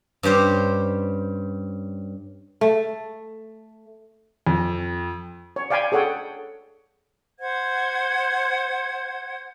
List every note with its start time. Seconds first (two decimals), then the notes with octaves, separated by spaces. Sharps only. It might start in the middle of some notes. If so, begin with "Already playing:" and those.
0.23 G2 C#4 G4 C5
2.61 A3
4.47 F2
5.56 C#5
5.70 D5 F5 G5 G#5 B5
5.92 G#4 A4 C#5 F#5 G5
7.39 C5 F#5 G#6